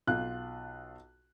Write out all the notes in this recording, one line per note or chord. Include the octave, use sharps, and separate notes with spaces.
B1 F4 F#6